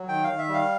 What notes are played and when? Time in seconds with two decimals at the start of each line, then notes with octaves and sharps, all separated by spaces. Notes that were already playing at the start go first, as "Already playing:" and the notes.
Already playing: F#3
0.08 D#3 G5
0.24 D#3 F5
0.38 E5
0.48 G3
0.54 F5